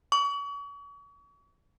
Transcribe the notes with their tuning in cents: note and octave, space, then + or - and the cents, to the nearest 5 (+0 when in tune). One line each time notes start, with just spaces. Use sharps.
C#6 +40